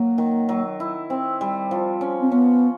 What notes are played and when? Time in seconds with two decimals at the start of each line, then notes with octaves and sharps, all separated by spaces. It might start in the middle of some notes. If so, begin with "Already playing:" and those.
Already playing: F#3 A#3
0.18 D#3
0.49 F#3
0.80 E4
1.10 C4
1.41 G3
1.71 F3
2.01 C#4
2.21 C4
2.32 B3 C#4